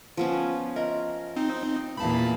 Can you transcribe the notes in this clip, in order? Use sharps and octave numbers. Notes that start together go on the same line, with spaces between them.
F3 B3 C#4
A#4 D#5 E5 C6
C4 D#4
E2 A#2 C#4 F5 A5 B5